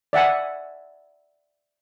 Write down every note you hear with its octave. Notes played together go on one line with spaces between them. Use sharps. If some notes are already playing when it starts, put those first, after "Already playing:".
D5 E5 F#5 G#5